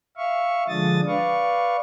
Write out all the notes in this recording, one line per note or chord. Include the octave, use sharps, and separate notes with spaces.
E5 F5 C#6
D3 F3 G#3 D4 D#6 A6
B4 D5 F5 C#6